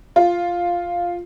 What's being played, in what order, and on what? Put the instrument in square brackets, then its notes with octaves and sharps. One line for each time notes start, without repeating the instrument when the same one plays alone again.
[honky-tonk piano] F4